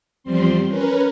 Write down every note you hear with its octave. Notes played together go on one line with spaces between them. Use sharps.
E2 F3 G3 C4 C6
C#4 A#4 B4